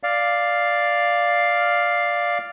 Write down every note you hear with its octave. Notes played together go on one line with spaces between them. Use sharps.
D5 F5